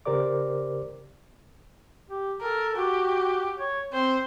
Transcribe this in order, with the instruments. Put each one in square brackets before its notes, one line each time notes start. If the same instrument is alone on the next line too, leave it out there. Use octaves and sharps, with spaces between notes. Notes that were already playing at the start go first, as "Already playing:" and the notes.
[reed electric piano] C#3 G4 A#4 C5 D5 D6
[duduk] G4
[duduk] A4 [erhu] A#4
[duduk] F#4 [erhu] G4
[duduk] C#5
[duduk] C4 [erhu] C5